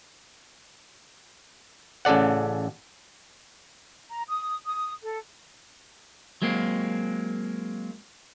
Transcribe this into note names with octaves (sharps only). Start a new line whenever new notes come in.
A1 C#3 A4 D5 F#5
A#5
D#6
D#6
A4
F#3 G#3 A#3 C4